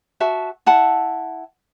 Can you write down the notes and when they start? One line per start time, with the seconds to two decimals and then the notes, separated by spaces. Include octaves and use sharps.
0.20 F#4 E5 A5
0.66 E4 F#5 A5